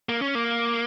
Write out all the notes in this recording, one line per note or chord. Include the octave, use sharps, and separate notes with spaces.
A#3
C#4
A#3